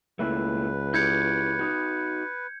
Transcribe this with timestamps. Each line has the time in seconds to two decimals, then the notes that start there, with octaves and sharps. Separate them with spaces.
0.19 C#2 A3 A#3 E4 B4
0.94 E4 G4 G6 G#6 C#7
1.59 D#4 F#4